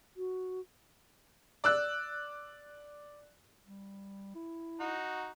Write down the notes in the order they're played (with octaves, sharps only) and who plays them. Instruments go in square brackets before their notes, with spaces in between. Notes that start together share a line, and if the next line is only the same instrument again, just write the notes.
[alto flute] F#4
[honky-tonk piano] D5 E6 F#6
[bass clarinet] G3
E4
[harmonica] D#4 F#4